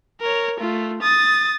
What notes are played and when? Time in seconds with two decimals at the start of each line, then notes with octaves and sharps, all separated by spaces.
0.21 A#4 C#5
0.60 A3 F4
1.02 D#6 A6